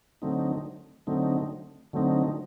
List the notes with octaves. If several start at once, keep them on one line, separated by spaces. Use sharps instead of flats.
D3 F#3 A3 C4 D#4
D3 F#3 A3 C4 D#4
D3 F#3 A3 C4 D#4